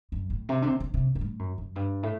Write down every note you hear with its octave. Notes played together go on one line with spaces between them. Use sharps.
F#2
A2
C3
D3
C3
D3
C3
G2
A2
F#2
F#2
G2
A2